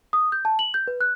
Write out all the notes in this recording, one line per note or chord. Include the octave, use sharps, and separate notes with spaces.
D#6
G6
A5
F#7
G6
B4
F#6